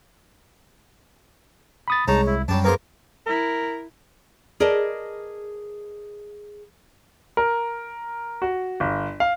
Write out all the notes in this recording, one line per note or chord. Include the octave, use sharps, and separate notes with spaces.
B5 D#6 A6
C2 G#3 C#4 D#4 A5 A#5
E4
F#2 F#3 G3 D4 A5
A#3 B3 G#4 A#4 C5
E4 A#4
G#4 A#4 B4 D5 D#5 A5
A#4
F#4
G1
F5